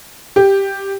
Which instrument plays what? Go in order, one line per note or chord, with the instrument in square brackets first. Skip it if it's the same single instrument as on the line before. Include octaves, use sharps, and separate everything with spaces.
[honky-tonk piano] G4